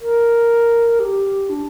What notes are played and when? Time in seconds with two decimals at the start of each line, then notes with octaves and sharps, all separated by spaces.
0.01 A#4
0.99 G4
1.49 D4